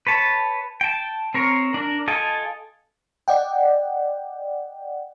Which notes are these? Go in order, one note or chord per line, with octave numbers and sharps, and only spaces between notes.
B4 C#5 A5
G5 A5
C4 A#4 C#5
D4 A#4
F4 A4 D#5 G5 G#5
D5 D#5 F#5 G5